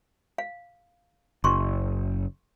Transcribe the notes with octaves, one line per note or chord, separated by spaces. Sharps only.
F5
F#1 C6 C#6